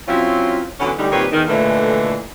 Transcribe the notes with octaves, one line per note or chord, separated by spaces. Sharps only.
F#3 C4 C#4 E4 F4
D3 E3 F#3 B3 C#4
D2 G3 D#4
A#2 D#3 G3 C4 B4 C#5
E2 D#3
A#2 D3 E3 G#3 A3